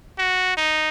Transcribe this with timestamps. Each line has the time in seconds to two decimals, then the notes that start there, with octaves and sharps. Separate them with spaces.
0.19 F#4
0.57 D#4